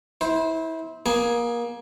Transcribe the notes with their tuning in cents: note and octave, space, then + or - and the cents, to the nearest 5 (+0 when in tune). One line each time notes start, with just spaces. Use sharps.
E4 -25 C5 +0
A#3 +25 G#4 +0 G#5 +20